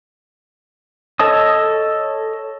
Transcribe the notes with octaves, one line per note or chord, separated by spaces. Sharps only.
A4 C#5 D#5 A5 D#6